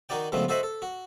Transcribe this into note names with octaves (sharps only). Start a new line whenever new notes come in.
D#3 D#4 F#4 D5 G5
C#2 G2 B2 F3 A3 C4
F#4 A4 C5 D#5 E5 F#5
A4
F#4